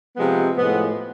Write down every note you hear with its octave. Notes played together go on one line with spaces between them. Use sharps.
C3 F3 G#3 B3
A2 F3 G#3 B3